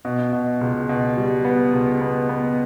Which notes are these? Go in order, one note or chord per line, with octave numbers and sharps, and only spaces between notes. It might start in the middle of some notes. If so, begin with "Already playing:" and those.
B2
B2
C#2
B2
G3
B3
C#2
B3
B3